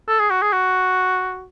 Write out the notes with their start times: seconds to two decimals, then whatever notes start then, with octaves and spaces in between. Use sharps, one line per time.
0.08 A4
0.19 G#4
0.30 F#4
0.42 G#4
0.53 F#4